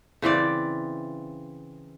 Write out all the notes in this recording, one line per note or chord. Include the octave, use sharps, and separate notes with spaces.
C#3 E3 C4 D5